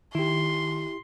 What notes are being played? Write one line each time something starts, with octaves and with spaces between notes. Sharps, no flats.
D#3 E4 G4 C6